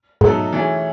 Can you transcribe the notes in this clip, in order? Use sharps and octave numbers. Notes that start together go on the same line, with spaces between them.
G#2 B2 F#3 A3 D#4 A4
E3 A3 C#4 E4 G#4